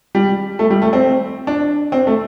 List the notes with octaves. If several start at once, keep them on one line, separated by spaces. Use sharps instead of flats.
G3
A3
G3
A3
C4
D4
C4
A3